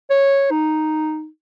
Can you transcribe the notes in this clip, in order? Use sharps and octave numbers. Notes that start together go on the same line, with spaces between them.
C#5
D#4